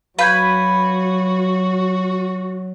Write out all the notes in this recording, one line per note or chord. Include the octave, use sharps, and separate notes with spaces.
F#3 F#4 B4 F5 B5 G6 G#6